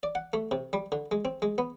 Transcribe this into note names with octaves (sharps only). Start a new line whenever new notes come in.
D5
F#5
A3
C3
G3
D3
G#3
C4
G#3
B3